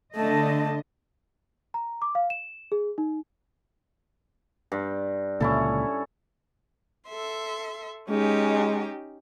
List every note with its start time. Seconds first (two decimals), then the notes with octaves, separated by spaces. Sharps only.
0.15 D3 A3 D#5 A5
1.74 A#5
2.02 D6
2.15 F5
2.30 E7
2.72 G#4
2.98 D#4
4.72 G2
5.40 C#2 A#2 D3 C#4 E4 A4
7.07 A4 E5 C6
8.09 G#3 C#4 D#4 G4